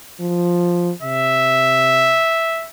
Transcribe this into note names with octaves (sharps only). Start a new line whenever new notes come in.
F3
C3 E5